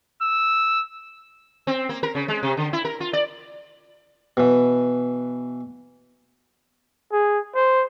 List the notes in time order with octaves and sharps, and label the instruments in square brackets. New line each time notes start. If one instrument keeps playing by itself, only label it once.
[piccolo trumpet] E6
[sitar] C4
A#3
A#4
C#3
G#3
C3
D3
E4
A#4
F4
D5
[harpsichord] B2 E3
[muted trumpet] G#4
C5